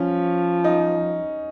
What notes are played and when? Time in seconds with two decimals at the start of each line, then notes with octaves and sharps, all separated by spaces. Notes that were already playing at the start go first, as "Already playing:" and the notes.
Already playing: F3 C#4
0.64 D#4